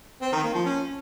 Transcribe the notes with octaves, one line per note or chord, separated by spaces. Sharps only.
C4
D#3
A#3
F3
C#4